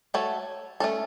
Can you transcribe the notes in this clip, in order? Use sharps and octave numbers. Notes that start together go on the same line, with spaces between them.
A3 F#4 A4 C#5
A3 C#4 A4